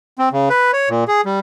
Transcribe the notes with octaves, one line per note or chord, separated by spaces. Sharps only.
C4
C#3
B4
C#5
A#2
G#4
G3